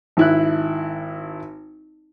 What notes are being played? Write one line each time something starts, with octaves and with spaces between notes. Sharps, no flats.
G#1 E4 F#6